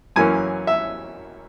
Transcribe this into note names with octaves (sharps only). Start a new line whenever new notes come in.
F#2 E3 A#3 C#4 G#5
E5